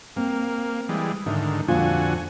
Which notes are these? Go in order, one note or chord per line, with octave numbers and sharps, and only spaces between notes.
A#3 C4
E3 G3 G#3
G#2 D3 D#3 E5
F2 A#2 D3 F4 F#4 G#5